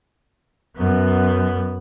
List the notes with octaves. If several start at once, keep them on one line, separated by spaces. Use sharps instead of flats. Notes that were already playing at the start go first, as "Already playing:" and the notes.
F#2 B3